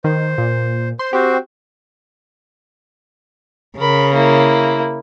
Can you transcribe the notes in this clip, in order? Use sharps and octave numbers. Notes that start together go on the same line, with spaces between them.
D#3 C5
A#2
C5 C6
C4 F#4 G4 C5
C#3 A#4 B5
A#3 E4